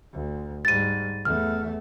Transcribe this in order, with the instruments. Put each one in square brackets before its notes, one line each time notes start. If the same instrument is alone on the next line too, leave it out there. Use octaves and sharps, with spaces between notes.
[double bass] D2
[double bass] G#2 G3 [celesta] A6 D#7
[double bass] E2 A3 [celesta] F6